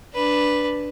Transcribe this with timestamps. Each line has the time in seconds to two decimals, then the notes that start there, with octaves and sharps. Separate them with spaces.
0.14 D4 B4